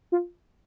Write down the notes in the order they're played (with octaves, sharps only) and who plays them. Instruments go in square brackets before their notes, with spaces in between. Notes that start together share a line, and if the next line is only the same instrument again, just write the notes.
[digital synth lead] F4